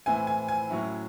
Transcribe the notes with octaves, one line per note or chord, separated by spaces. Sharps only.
A2 E3 C4 E4 G#5
G#5
G#5
A2 F#3 C#4 E4